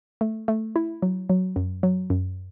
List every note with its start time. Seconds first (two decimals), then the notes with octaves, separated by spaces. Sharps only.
0.21 A3
0.48 A3
0.76 E4
1.02 F#3
1.29 F#3
1.56 F#2
1.83 F#3
2.10 F#2